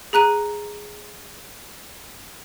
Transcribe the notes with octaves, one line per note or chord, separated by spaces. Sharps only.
G#4 A#5 F#6 D#7